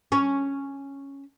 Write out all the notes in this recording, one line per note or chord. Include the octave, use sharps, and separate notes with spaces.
C#4